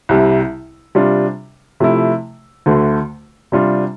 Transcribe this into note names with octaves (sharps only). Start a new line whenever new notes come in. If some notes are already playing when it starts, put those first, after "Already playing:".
C2 C3 G3
C3 G3 D4 F4
C3 F3 A3 E4
D2 D3 A3
C3 G3 D4 F4